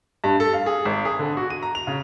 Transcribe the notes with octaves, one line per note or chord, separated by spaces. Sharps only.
G2
A4
F5
G#4
G#1
G#4
D3
F#4
D#7
A#5
F7
C#3